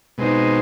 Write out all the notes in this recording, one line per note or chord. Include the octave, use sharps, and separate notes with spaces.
B2 G#3 C4 D#4